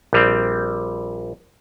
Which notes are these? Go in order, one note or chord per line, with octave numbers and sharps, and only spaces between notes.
A#1 G3 C4